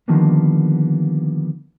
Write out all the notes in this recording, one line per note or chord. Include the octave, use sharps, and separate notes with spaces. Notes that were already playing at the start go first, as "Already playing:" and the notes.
D3 D#3 F3 G3 A#3 B3